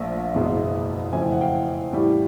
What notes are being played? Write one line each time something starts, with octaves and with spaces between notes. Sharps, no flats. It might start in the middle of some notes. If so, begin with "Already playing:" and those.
Already playing: A#1 A#2 F3 A3 E5
F#1 E2 B2 G#3
F2 C#3 E3 A3 C4 G#5
G5
F#5
F5 G5
A2 E3 G3